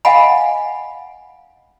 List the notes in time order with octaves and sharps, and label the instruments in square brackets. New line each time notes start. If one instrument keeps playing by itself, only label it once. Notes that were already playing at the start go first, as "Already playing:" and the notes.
[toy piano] D#5 F5 F#5 G#5 B5